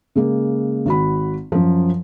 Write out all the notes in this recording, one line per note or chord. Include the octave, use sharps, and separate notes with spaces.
C#3 G#3 A#3
G#1 F#4 B5
F#2 F3